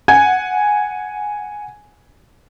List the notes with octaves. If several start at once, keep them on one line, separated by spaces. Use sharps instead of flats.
F#5 G#5 G#6